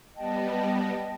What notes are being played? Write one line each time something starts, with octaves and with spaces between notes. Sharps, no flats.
G3 B3 D#5 G5 A5